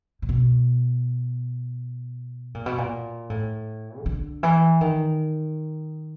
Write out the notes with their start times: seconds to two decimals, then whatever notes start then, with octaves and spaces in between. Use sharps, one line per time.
0.22 A#2
0.29 B2
2.54 A#2
2.66 B2
2.78 A#2
3.30 A2
4.00 D#3
4.06 D3
4.43 E3
4.81 D#3